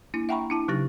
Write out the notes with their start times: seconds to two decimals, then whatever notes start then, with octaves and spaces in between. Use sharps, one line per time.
0.14 A#3 D4 E4
0.29 E5 F#5 G5 A#5 B5 C#6
0.50 D4 E4 A5
0.68 C#3 F#3 D#4 G4 A6 A#6